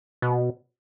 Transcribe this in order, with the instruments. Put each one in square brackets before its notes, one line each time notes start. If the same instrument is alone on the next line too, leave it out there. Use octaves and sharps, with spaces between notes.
[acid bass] B2